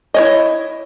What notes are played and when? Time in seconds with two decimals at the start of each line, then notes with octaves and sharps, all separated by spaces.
0.14 E4 C#5 D#5